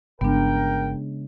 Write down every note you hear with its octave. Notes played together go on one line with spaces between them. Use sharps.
G1 C#3 G#3 B3 D4 A#4 G5